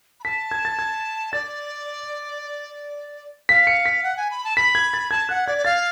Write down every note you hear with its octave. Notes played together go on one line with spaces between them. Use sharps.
B5
A5 B6
G#6
A6
G#6
D5 A6
F5 B6
C#7
B6
F#5
G#5
B5
A5
B5 B6
G#6
A6
A5 G#6
F#5 F#6
D5 G#6
D5
F5 A6